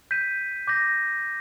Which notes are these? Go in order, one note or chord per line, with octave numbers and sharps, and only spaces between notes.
G6 B6 D#7
D6 G6 A#6